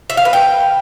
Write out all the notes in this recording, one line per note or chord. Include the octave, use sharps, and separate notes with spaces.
E5
F5
B4
G5